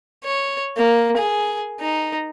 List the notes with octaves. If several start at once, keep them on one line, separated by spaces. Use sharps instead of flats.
C#5
A#3
G#4
D#4